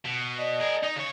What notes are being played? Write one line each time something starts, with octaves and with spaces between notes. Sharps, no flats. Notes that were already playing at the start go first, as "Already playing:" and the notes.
B2
D5 D#5 D#6
G#4 A#4
D#4
C#3 C#5